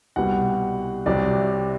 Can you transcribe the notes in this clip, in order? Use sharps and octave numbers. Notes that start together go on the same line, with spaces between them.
C2 B2 G3 F#5
C2 C3 F#3 D5